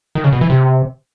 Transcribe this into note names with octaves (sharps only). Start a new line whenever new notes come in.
D#3
C#3
B2
E3
C3